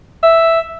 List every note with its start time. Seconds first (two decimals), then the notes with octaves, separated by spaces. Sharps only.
0.23 E5